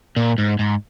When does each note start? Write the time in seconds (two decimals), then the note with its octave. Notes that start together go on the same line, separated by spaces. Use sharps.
0.16 A#2
0.38 G#2
0.59 G#2